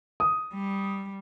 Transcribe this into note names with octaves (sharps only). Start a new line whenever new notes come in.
D#6
G3